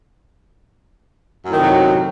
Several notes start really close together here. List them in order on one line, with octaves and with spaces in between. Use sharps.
F#2 A2 D#3 C3 F#3